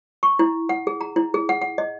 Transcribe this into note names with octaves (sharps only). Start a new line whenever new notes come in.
C#6
E4
F#5
G#4
A#5
E4
G#4
F#5
F#5
D#5